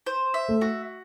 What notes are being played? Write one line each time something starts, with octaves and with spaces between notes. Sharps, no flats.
C5
E5
A3
F#4